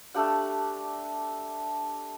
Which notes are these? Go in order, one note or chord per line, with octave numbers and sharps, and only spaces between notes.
A3 D4 G4 F#5